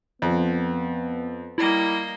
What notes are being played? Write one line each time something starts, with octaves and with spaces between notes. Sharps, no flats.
F2 B3
G3 A#3 E4 D#5